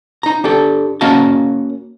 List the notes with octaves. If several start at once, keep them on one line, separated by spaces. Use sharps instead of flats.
D#4 A#5
D4 G4 A4
A#3 C#4 F#4 D#5 F5 A5